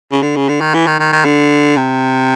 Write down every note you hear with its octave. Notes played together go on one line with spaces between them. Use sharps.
C#3
D3
C#3
D3
D#3
E3
D#3
D#3
D#3
D3
C3